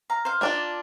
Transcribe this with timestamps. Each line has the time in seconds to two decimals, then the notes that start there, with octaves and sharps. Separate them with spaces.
0.10 F5 A#5
0.25 C5 F5
0.41 A#3 D4 F4 D5